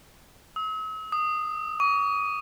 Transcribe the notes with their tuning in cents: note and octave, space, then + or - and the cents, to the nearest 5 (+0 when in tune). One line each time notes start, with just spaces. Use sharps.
E6 -45
D#6 -15
C#6 +40